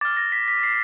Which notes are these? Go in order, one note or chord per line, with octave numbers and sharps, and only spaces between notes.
D6 F6 A6
A#6
B6
B6
C7